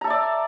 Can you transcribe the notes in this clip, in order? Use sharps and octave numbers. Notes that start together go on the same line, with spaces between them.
A4 D5 E5 A#5